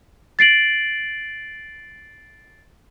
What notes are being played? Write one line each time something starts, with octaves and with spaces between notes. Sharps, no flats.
A6 C7 D7 F#7